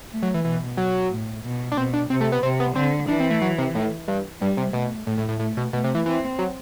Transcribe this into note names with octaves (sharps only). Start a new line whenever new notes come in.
A3
F#3
E3
B2 E3
F#3
A2
B2
D4
B2 C4
D4
C3 C4
A3
B3
C3 C4
B3
D3 C4
E3 D4
C4
A3
F#3
C3
A2
G2
G2 G3
C3
B2 A3
A2 A3
A2
A2
A2 A3
B2
B2 A3
C3
E3
E3 C4
F#3